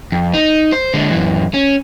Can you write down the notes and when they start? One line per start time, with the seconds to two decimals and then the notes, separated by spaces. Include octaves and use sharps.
0.12 F2
0.34 D#4
0.72 C5
0.94 D3 G#3
1.11 F#2 E3
1.54 C#4